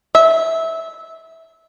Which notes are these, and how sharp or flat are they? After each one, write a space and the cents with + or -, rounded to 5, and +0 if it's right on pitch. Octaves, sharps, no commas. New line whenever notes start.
E5 -15